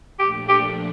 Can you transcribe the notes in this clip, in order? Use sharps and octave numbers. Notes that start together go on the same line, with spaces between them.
A#2 F3 A3 D4 G4
G4